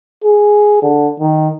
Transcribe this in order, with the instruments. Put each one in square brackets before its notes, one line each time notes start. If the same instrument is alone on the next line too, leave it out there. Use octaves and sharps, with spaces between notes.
[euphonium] G#4
D3
D#3